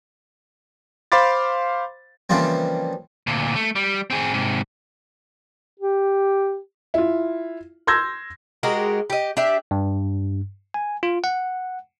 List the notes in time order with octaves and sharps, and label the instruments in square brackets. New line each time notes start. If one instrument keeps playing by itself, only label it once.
[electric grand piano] C5 F5 B5 C6 D6 A6
[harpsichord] C#3 E3 F3 G3 A#3 C4
[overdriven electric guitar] D2 A#2
A3
G3
C4 G#4
G#2 C3
[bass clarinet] G4
[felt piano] E4 F4
C6 E6 G6 G#6 A#6
[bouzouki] G#3 F#4 G4 A#4
G4 D#5
D4 G4 E5
[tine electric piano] G2
G#5
F4
F#5